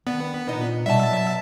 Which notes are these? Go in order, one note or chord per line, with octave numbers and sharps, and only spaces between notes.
D#3 B3 D4
A#2 D4 D#4
F#2 B2 G3 E5 A5
F#3